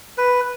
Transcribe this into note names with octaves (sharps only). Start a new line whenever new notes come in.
B4